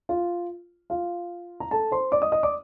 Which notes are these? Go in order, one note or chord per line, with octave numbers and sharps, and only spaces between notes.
F4
F4 F5
A#5
A4 A5
C5 C6
D5 D6
D#5 D#6
D#5 D#6
D5 D6